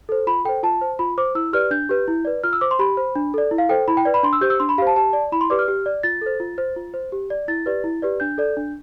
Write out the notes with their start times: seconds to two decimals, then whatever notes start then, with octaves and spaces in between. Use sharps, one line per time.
0.09 A4 C5
0.27 F4 B5
0.45 A4 C5 G5
0.63 F4 A5
0.81 C5
0.99 F4 B5
1.18 C5 D6
1.35 E4 E6
1.53 G4 B4 D5 F6
1.71 D4 G6
1.89 G4 B4
2.08 E4
2.25 B4 D5
2.44 F4 F6
2.53 E6
2.61 C5 D6
2.71 C6
2.79 G4 B5
2.97 C5
3.15 D4
3.34 A4 D5
3.51 E4
3.58 F5
3.69 A4 C5 G5
3.88 E4 B5
3.97 G5
4.05 B4 D5
4.14 B5
4.23 D4 C6
4.33 E6
4.41 G4 C5 G6
4.50 E6
4.60 D4 C6
4.69 B5
4.78 G4 F5
4.82 C5 A5
4.96 G4 A5
5.13 D5
5.32 E4 B5
5.41 C6
5.50 G4 B4 D5 D6
5.59 F6
5.68 G4
5.86 D5
6.03 F4 A6
6.21 A4 C5
6.40 F4
6.58 C5
6.76 F4
6.94 C5
7.12 G4
7.30 D5
7.48 E4 A6
7.66 G4 B4 D5
7.84 E4
8.02 G4 B4 D5
8.20 D4 G6
8.38 A4 D5
8.57 D4